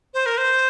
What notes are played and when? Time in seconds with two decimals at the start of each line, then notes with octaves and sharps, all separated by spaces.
0.14 C5
0.26 A#4
0.38 C5